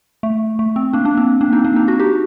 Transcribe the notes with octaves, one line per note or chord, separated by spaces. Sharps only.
A3
A3
C4
A#3 D4
A#3 D4
C4
A#3 D4
C4 D#4
A#3 D4
C4 D#4
D4 F#4
D#4 G4